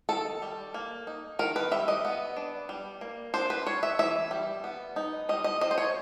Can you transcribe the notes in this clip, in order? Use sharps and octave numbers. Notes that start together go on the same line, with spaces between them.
D#3 A4
G3
A#3
D#4
D#3 A#4
B4
G3 E5
D#5
B3
D4
G3
A#3
D4 C5
B4
G3 C#5
E5
E3 E5
G3
B3
D#4
G3 D#5
D#5
C4 D#5
C5
C#5